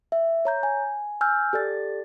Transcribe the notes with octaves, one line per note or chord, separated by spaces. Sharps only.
E5
C#5 A#5 G6
G#5
G#5 E6 F6 G6
G4 A4 D5 A6